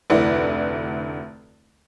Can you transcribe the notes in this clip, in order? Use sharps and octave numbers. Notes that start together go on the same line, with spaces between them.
F1 D2 E4 B4 D5 F#5